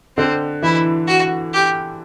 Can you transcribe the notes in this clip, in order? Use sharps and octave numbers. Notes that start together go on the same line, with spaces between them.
D3 C4
E3 E4
F#4
G4